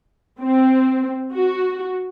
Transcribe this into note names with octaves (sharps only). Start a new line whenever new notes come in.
C4
F#4